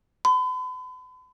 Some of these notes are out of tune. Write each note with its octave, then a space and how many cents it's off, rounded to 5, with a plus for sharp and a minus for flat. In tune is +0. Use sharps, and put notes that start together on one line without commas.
B5 +40